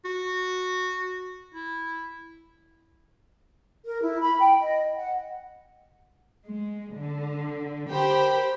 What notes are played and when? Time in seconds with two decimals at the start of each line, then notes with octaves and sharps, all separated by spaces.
0.05 F#4
1.55 E4
3.85 A#4
4.02 E4
4.21 B5
4.39 G5
4.59 D#5
4.96 F#5
6.46 G#3
6.95 D3
7.89 G4 A#4 C5 G5 B5